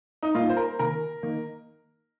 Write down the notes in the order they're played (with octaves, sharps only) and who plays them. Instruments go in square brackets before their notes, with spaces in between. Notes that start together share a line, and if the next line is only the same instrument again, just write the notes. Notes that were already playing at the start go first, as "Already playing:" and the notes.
[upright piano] D#4
[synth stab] A#2 G3 A#3 D#4 [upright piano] F4
[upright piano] C5
A#4
[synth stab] C3 D#3 A#3 [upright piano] A#4
[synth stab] D#3 A#3 D#4